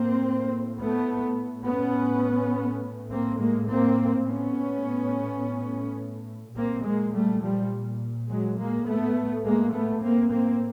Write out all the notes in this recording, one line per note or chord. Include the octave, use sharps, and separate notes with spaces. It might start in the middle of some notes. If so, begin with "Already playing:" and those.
Already playing: A2 A#3 C4
A3 B3
B3 C#4
A2
A#3 C4
G#3 A#3
A#3 C4
A2 B3 C#4
A#2 A#3 C4
G#3 A#3
G3 A3
F3 G3
F#3 G#3
G#3 A#3
A2 A3 B3
G#3 A#3
A3 B3
A#3 C4
A#3 C4